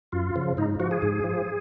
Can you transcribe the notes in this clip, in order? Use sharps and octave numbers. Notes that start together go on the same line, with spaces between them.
F#2 F4
C#3 F3
G#2 D#4
F3 F#4
G#4
G#2
F3